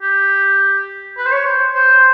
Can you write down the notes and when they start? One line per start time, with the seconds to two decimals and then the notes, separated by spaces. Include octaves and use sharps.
0.02 G4
1.18 B4
1.26 C5
1.32 C#5
1.46 C5
1.75 C5